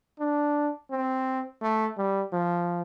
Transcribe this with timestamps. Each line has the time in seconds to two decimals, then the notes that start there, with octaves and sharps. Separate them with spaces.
0.20 D4
0.91 C4
1.62 A3
1.98 G3
2.33 F3